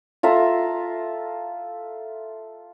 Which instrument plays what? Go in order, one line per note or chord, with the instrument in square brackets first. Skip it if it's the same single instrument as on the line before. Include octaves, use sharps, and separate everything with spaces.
[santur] F4 A4 E5 A#5